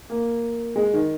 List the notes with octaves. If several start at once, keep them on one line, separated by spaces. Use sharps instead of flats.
A#3
G#3
D#3